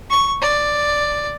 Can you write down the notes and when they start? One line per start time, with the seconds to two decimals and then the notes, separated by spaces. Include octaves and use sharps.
0.10 C#6
0.41 D5